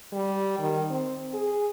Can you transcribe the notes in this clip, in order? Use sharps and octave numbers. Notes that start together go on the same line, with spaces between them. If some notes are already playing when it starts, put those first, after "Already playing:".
G3
D#3
C4
G#4